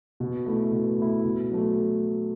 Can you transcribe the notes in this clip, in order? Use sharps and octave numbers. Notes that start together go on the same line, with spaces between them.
B2
A3 E4
B2
A3 E4
B2
F#3 A3